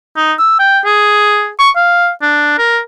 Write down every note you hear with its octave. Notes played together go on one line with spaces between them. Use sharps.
D#4
E6
G5
G#4
C#6
F5
D4
A#4